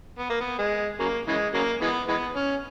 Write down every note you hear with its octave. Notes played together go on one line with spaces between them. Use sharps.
B3
A#3
B3
G#3
C#3 F#3 A#3
C#3 E3 G#3
C#3 F#3 A#3
E3 G#3 B3
E3 G#3 B3
C#4